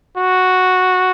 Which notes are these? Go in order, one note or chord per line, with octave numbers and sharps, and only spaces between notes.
F#4